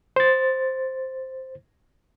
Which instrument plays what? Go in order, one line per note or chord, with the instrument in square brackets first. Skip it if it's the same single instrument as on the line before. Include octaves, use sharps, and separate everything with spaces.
[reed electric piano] C5 A6